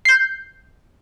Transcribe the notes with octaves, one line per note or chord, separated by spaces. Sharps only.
G6 C7